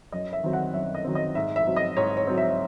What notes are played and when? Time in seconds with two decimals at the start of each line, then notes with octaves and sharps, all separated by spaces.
0.12 F#2 D#5
0.33 E5
0.43 D#3 F#3 C4
0.53 F#5
0.74 F#2 E5
0.95 D#5
1.04 D#3 F#3 C4
1.15 D#5
1.35 G#2 E5
1.56 E5
1.67 F#3 C4
1.76 D#5
1.97 G#2 C#5
2.17 C#5
2.27 F#3 C4
2.38 E5